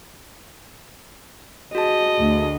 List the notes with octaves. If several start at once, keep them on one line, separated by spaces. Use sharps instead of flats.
F#4 G#4 D#5 A5
D2